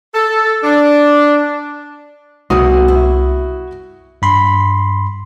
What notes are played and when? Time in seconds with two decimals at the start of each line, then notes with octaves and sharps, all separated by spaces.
0.14 A4
0.63 D4
2.50 C2 B2 A3 F#4 D#6
2.88 E4
4.22 G2 B5 C6